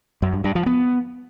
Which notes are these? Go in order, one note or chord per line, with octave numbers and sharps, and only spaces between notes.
F#2
G2
G2
F3
B3